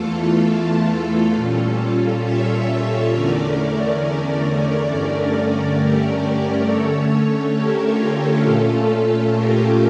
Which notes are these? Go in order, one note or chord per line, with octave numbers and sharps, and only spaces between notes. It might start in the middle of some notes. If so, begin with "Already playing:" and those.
Already playing: E2 E3 A3 F4 A4
A#2 G3 C#4 F4 A4
C#5 E5
E2 D3 A3 C#4 A#4 D5
G2 D3 A3 C#4
G4 A#4
D3 A3 C#4 A4 C#5
G4 A#4
F4 A4
G4
A#2 A3 C#4 F4 A4
G4 A#4